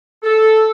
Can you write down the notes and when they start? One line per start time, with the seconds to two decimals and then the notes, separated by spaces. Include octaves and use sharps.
0.23 A4